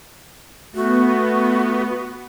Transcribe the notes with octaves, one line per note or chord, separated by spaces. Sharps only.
A3 B3 F#4